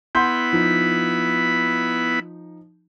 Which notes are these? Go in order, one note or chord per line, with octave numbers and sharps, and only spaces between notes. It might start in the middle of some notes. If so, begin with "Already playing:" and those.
B3 E4 F#5 B5 C6 G6
F3 D#4